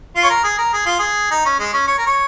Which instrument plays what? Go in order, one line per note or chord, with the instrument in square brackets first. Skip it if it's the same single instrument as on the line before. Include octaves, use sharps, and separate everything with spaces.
[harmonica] F4
C#5
A#4
G#4
A#4
G#4
F4
G#4
D#4
C#4
G#3
C#4
C#5
A#4
C#5